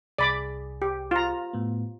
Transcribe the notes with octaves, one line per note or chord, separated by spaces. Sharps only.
C2 G#4 D5 B5 D6
G4
F4 A#5
A2 B3